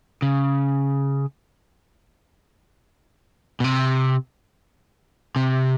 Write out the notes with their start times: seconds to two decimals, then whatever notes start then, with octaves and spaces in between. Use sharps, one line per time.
0.22 C#3
3.60 B2
3.64 C3
5.36 C3